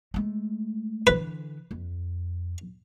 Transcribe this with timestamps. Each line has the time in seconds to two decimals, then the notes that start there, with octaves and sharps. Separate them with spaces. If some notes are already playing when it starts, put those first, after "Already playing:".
0.14 G#3 A3
1.07 D3 E3 B4
1.71 F2